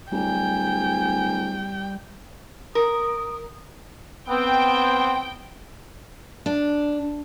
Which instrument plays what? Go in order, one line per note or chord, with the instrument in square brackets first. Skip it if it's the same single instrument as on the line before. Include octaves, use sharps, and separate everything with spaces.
[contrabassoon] D1 [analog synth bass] G3 [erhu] G5 [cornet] G#5
[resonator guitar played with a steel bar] A#4 [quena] D#6
[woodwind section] B3 C4 [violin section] G5
[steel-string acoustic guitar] D4